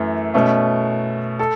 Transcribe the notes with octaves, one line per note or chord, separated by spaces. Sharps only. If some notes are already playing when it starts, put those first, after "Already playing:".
Already playing: F#2 E3 A3
B2 A3 C#4
A4